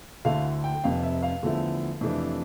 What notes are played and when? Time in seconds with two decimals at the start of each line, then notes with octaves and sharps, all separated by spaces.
0.25 D2 D3 A3 E4 F5
0.64 G5
0.84 F1 F2 C3 F5
1.03 E5
1.23 F5
1.42 E2 D3 F3 A3 E4
2.01 F2 C3 E3 A3 D4